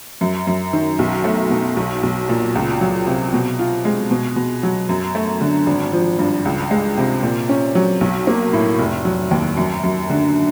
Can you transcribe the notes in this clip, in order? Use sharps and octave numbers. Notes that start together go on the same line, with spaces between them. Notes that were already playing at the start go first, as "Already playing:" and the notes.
F#2
F#2
D#3
B1
A3
B2
B1
B1
A#2
C#2
F#3
C3
B2
F4
G#3
B2
B2
F#3
F#2
A3
D3
G#1
F3
G2
C#2
G#3
C3
A#2
C#4
F#3
B1
A#3
A2
F1
F#3
D#2
F#2
F#2
D3